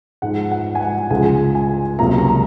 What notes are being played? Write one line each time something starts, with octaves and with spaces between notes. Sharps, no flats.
G#2 F3 G#3 F#5
F#5
G#5
F#5
C#2 C#3 F3 G#3 G#5
G#5
C#2 C3 F#3 A#3 A#5
A#5
A#5